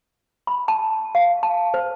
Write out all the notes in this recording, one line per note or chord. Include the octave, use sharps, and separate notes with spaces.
B5
A5
F5
A5
C5